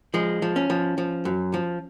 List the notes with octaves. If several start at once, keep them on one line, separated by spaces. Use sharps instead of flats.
F3 G#3
F3
C#4
F3
F3
F#2
F3